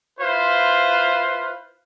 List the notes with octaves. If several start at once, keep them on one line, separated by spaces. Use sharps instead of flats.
E4 F4 B4 C5 F5